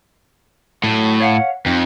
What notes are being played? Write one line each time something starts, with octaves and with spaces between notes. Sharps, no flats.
A2 F#3 A3
C#5 F5 F#5
F2 C4 D#4